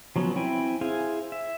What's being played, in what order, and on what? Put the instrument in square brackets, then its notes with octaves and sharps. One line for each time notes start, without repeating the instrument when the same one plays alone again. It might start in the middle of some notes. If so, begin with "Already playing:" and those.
[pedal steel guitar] F3 F#3 B3 C#4
C4 E4 G5 G#5 B5
E4 G#4 C5 F5 G#5
E5